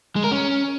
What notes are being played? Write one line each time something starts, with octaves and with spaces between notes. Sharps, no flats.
G#3
A#4
C#4